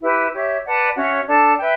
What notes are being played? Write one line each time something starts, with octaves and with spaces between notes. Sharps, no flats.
E4 G4 B4
G4 C#5 E5
B4 D5 F#5 A5
C#4 F#4 C#5 E5
D4 A4 D5 A5
B4 E5 G5